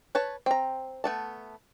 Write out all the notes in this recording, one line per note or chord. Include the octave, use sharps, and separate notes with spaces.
B4 C#5 A5
C4 A#5
A3 B3 A5